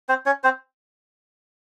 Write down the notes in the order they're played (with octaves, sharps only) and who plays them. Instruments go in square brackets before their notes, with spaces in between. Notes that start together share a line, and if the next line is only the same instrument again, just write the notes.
[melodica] C4 C5
C#4 C#5
C4 C5